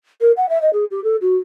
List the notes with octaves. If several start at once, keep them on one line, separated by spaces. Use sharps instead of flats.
A#4
F#5
E5
D#5
G#4
G4
A4
F#4